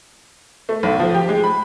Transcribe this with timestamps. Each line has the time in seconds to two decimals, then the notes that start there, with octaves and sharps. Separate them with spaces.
0.69 A3
0.83 B1
1.00 F3
1.15 G4
1.29 G#3
1.44 B5